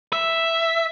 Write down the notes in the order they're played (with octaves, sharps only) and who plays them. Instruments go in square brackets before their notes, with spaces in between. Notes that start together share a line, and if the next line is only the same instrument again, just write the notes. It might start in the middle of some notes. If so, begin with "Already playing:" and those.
[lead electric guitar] E5